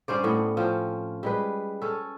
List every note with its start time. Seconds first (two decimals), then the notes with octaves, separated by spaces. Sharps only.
0.08 G2 C#4 C5 D5
0.24 A2 B3
0.57 F3 C4 C#4
1.23 G3 G#3 B4
1.82 C#4 A4